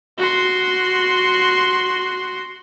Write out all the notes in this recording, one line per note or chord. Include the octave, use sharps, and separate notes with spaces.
F#4 C6